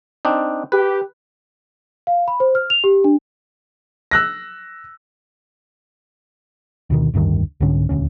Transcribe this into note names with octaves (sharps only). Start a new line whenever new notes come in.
C4 D4 D#4
G4 B4
F5
B5
C5
F6
F7
G4
D4
E6 F#6 A#6
D2 B2 D#3
F1 D2 G2 D#3
C2 G#2 D3 C#4
D#1 D2 C#4